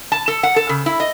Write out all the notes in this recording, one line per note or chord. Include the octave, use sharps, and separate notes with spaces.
A5
A4
F#5
A4
C#3
E4
D#5